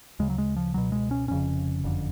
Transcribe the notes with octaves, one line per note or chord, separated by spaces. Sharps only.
D2 C#3 G#3
F#3
G#3
F3
C#2 B2 F#3
G#3
C#4
F1 F2 C#3 C#4
F#1 F2 D3